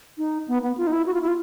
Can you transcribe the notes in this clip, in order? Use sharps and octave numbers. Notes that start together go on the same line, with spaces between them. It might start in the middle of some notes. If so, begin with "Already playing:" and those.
D#4
B3
B3
F4
D#4
E4
F#4
F4
E4
F4